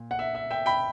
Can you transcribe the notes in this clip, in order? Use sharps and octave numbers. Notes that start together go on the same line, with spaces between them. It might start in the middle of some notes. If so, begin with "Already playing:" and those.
Already playing: A#2
F#5
E5
E5
E5 G5
G5 B5